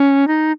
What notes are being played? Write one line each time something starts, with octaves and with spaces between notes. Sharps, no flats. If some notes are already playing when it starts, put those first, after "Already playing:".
Already playing: C#4
D#4